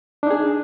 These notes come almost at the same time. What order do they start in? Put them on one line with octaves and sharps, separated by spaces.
D4 D#4 G#4